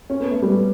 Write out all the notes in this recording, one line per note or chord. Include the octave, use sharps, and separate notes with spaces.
C#4
B3
A3
G3 B3